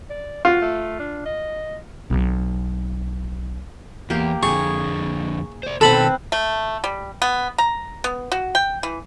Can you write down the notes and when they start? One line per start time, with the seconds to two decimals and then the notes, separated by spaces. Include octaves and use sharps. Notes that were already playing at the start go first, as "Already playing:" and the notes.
0.10 D5
0.45 F4 F#4
0.61 A3
0.99 D4
1.26 D#5
2.10 B1 C4
4.10 E2 A#3 G4
4.43 F2 D3 G#4 C#6
5.63 C5 D5
5.81 B2 D#3 C4 A4 B4 B5
6.32 A3
6.84 G3
7.22 B3
7.58 A#5
8.04 B3
8.32 F#4
8.55 G5
8.83 E3